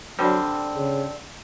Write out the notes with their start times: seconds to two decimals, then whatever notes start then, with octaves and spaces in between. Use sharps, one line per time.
0.19 D3 F#3 G3 C4
0.76 C#3